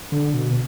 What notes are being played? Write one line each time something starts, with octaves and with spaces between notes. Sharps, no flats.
D3
B2